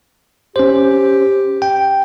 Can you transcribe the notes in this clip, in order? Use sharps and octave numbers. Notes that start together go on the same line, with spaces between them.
C#4 G4 C5
G5